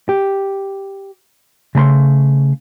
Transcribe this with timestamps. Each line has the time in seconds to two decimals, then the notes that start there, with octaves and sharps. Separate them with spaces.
0.09 G4
1.75 C#3 A3 A#5 C6